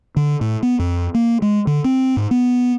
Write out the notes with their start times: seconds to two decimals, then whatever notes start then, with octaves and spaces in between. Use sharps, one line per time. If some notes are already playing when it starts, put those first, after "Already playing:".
0.16 D3
0.41 A2
0.63 B3
0.79 F2
1.14 A#3
1.42 G#3
1.67 D3
1.84 C4
2.17 G#2
2.31 B3